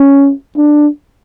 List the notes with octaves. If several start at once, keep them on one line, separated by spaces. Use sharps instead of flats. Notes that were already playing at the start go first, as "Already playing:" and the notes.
Already playing: C#4
D4